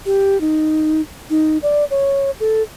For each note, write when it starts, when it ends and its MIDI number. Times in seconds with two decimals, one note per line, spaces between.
0.06 0.40 67
0.41 1.01 63
1.30 1.58 63
1.63 1.85 74
1.91 2.31 73
2.40 2.63 69